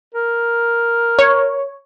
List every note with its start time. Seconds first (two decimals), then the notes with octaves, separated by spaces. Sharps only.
0.15 A#4
1.19 C#5